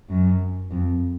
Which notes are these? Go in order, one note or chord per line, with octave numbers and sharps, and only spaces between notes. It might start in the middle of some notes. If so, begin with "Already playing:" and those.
F#2
F2